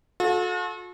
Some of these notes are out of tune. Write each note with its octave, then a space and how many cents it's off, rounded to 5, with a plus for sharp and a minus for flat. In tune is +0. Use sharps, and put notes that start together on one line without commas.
F#4 -45 A4 -25